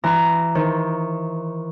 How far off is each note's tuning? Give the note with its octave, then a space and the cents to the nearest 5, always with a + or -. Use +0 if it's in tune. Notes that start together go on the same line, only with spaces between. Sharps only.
E3 +20 A#5 +0
D#3 +25 C5 +15